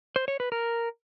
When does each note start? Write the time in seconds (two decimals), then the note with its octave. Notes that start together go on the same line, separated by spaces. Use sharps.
0.16 C5
0.28 C#5
0.40 B4
0.52 A#4